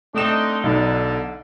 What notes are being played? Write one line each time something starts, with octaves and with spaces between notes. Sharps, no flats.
A3 C4 D4 D#4 E7
B1 D3 D#4